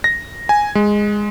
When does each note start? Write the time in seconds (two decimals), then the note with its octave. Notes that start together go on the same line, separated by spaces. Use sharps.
0.04 A#6
0.49 G#5
0.75 G#3